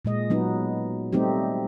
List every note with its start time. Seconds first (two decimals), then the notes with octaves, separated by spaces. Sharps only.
0.05 A#2 G#3 D#5
0.30 F#3 B3 D#4
1.13 G3 A3 C4 D#4 G4